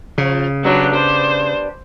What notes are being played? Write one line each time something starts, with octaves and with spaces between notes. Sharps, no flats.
C#3 F3
F#3 G3 B3 D4
C5